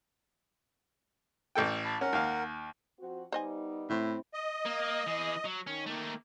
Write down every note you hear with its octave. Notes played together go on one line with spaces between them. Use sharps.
A1 A4 G5
A5 B5
C#4 A#4 F#5
D#2 F5
F3 C4 F#4
G3 B3 D#4 C5 D#5 G#5
A2 C4 E4
D#5
A#3
E3 G#4
F#3
D#3 C#4
A3 A#3